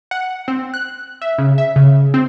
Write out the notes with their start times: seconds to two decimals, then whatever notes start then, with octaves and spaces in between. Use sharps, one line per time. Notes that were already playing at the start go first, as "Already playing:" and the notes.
0.11 F#5
0.48 C4
0.74 F#6
1.22 E5
1.38 C#3
1.58 E5
1.76 C#3
2.14 C4